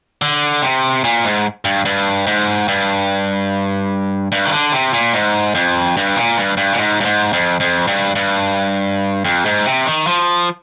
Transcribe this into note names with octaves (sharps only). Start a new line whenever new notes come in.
D3
C3
A#2
G#2
G2
G2
G#2
G2
G2
D#3
D3
C3
A#2
G#2
F2
G2
A#2
G2
G2
A#2
G#2
G2
G#2
F2
F2
G2
G2
F2
G#2
C3
D#3
F3